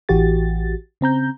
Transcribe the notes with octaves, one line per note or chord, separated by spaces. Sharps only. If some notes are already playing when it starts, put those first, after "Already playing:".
A1 E3 F#4 G4 A6
C#3 C4 A#5 G6